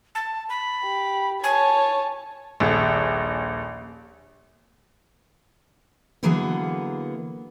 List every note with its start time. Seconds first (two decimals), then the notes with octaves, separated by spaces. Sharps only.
0.15 A5
0.49 B5
0.85 G4
1.44 C#5 G#5 A5
2.60 D#1 A#1
6.23 D3 E3 F#3 A#3 B3 G#4